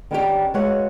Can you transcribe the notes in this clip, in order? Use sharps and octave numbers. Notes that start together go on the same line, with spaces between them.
D#3 B3 C#4 D4 F#4 G4
C#3 G#3 B3 F#4 C#5 F#5